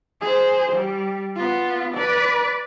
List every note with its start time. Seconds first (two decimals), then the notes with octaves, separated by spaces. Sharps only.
0.21 G#4 C5
0.72 G3
1.36 B3 F4
1.95 B4 D5